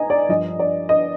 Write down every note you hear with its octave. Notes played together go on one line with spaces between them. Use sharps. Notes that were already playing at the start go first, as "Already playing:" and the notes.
Already playing: G#2 D#5 G#5 A#5
D5
G2 F3 D#5
D5
D#5